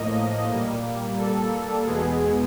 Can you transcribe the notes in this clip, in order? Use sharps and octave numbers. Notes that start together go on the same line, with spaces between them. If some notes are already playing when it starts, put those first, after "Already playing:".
Already playing: A2 F3 A#3 D#5
A#2 G3 A#3
A4
E2 B2 G#3 B3 G#4